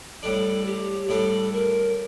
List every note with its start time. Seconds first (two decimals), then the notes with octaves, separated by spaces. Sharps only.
0.23 A2 G3 D4 A4
0.66 G4
1.09 A2 G3 D4 A4
1.53 A#4